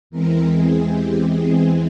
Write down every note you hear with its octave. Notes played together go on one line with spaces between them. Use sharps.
E2 E3 G#3 C4 A#4
G#4
G4
G#4